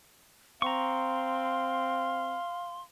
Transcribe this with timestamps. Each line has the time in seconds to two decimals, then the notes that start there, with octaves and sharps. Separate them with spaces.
0.62 C4 F5 A#5 C6 C#6